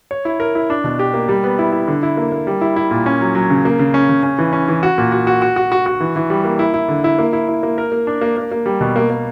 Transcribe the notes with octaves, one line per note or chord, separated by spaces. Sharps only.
C#5
E4
A#4
E4
D4
B2
G4
A#3
G3
B3
E4
E4
D3
E4
A#3
A#3
G3
E4
E4
A#2
C#4
F#3
F#3
C#3
A#3
C#3
C#4
C#3
C#4
E3
C#4
E3
F#4
A#2
F#4
F#4
F#4
F#4
F#4
F#4
E3
E3
G3
A#3
E4
E4
D3
E4
A#3
E4
E4
A#3
A#4
A#3
D4
A#3
A#3
A#3
G3
B2
A#3
A#3